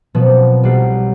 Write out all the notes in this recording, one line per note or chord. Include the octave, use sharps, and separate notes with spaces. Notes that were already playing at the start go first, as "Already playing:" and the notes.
B2 F3 F#3 B3 C4
B1 G3 G4 F#5 C7